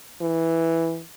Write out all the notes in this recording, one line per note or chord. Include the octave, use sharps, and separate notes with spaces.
E3